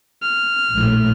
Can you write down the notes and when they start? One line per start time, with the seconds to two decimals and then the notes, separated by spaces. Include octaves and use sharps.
0.23 F6
0.72 A#1 A2